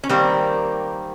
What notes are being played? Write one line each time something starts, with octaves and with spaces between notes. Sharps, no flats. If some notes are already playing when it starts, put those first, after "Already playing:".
C#4
D#3 G3 A#3 C4